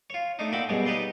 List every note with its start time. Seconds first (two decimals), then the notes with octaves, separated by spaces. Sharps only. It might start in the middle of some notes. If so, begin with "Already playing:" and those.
0.10 F4 C#5
0.39 A3 D4 D#4
0.52 A#2 F#4 E5 G5 B5 D6
0.69 F#2 B2 G3 G#3
0.86 D#4 G4 B4 D5 C6